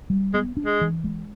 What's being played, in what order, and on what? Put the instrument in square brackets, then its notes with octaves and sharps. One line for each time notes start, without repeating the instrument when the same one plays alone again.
[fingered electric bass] G3
[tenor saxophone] G#3 [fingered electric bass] B3
[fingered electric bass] D4
[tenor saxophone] G#3
[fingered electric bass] E3
G#3